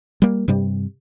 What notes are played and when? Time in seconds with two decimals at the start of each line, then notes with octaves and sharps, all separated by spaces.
0.22 G3 A#3
0.48 G2 C3 G3